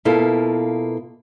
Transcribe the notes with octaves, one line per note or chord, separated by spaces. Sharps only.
B2 A#3 E4 F4 A4